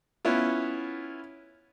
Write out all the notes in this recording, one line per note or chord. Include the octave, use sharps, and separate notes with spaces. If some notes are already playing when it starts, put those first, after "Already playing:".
B3 C#4 E4 F4